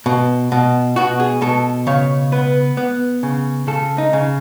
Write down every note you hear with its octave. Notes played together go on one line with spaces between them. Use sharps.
B2
B2
B2 F#4
G#4
B2 A4
C#3 C#5
B3 B4
B3
C#3
C#3 A4
D#4
C#3